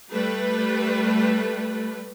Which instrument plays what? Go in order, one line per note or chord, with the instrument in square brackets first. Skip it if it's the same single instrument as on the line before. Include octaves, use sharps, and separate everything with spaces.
[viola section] G3 A3 B4